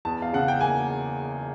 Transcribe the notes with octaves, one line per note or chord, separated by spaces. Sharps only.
E2 A5
F5
C#3 F#5
G5
A#3 G#5